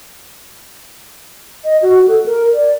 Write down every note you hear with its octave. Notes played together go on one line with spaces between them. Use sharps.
D#5
F#4
A4
A#4
D5